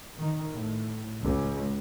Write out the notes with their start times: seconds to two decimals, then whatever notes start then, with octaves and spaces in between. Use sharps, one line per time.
0.18 D#3
0.54 A2
1.23 C#2